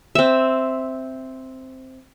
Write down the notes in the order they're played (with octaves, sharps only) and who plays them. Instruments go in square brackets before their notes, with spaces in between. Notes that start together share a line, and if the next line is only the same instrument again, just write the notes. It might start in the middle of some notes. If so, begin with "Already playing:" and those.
[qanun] C4 E5